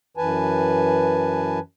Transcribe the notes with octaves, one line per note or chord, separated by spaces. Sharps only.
F#2 E3 B4 G#5 A5